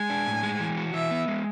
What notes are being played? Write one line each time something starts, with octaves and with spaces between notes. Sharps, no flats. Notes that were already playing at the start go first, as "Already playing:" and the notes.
Already playing: G#3 G#5
D4
A2
G#3
E3
F#4
E3 E5
B3
G#3